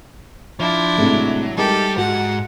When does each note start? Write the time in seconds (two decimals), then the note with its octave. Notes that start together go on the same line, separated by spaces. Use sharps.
0.60 F3 D4 E4
0.98 A2 C3 F#3 G#3
1.58 G3 G#3 D#4 G4 A4 A#4
1.98 G#2 F#4 F#5